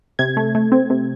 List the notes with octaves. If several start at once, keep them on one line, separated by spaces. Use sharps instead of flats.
C3 G#6
A3
A3
C4
C3